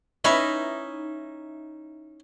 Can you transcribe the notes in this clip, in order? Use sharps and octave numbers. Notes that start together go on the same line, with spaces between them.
C#4 D#4 E4 B4 E5